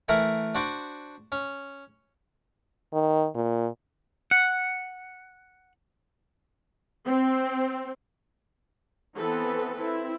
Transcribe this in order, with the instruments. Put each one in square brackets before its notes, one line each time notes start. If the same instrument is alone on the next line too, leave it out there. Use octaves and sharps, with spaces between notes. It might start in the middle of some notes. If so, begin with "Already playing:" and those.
[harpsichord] E3 A3 A#4 F#5 G#5
D4 F#4 C5 F#5 D6
C#4
[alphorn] D#3
A#2
[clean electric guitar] F#5
[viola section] C4
E3 B3 C4 A4 B4
C4 E4